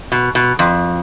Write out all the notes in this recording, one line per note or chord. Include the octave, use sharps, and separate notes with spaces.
B2
B2
F2